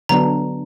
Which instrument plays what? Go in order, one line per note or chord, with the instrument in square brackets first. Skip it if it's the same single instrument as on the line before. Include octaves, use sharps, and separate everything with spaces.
[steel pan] D3 F#3 B3 D4 [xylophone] A#5